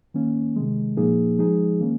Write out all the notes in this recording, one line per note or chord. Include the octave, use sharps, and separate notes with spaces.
D#3 A#3 C#4
C3 D#3 G#3
A#2 F3 A#3 D#4 G#4
F3 G#3 D#4 G#4
D#3 A#3 C#4